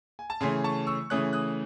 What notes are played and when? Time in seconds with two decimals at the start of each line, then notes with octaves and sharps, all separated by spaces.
0.19 G#5
0.30 A5
0.41 C#3 E3 A3 C#4 G#5 C6
0.64 A5 C#6
0.87 C#6 E6
1.10 C#3 E3 A3 C#4 D#6 F#6
1.33 D#6 F#6